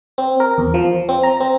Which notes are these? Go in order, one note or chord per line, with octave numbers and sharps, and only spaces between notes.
C4
A#4
E2
F3
C4
A#5
C4